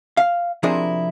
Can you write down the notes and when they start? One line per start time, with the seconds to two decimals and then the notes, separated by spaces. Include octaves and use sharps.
0.17 F5
0.63 C3 F3 D4 E4 G#4 A#4